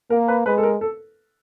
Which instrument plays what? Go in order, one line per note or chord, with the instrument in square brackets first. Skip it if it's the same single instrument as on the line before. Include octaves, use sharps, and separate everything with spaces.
[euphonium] A#3 [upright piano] A#4
[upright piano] B4
[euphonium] G#3 [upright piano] B4
[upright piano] A4
A#4
A4